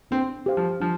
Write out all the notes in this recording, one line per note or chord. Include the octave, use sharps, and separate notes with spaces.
C4 D4
G4 C5 F5
F3
F3 D4